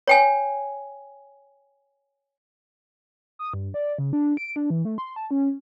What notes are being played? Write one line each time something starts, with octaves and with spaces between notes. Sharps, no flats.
C#5 G5 G#5
D#6
G2
D5
C#3
D4
D7
D4
E3
A3
C6
A5
C#4